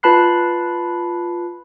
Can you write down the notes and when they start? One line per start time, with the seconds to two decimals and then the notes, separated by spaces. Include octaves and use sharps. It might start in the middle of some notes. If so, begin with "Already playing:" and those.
0.03 F4 B4 A5 B5 F#6 C7